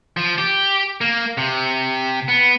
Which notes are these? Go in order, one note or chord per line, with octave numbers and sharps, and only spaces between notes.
F3
G4
A#3
C3
B3